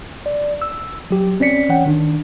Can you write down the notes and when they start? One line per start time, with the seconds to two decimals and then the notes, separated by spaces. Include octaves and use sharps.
0.26 D5
0.62 E6
1.11 F#3 G4
1.40 C4 C#4 D5 B6 C#7
1.69 E3 C#4 C#5 F#5 G5
1.86 D#3 D4